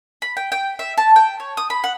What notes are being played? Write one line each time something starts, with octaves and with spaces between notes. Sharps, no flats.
B5
G5
G5
E5
A5
G5
C#5
D#6
B5
F#5